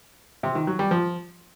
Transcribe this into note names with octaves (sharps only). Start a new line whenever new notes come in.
C3
D#3
F#3
G3
F3